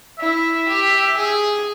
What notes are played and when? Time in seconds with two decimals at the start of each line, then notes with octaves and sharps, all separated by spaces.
0.20 E4 E5
0.68 G4
1.17 G#4